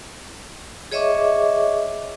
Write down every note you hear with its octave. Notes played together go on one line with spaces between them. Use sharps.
G#4 C#5 D#5 E5 C#6 D6